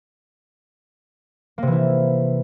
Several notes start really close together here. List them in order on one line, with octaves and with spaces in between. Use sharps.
A#3 C3 E3 E4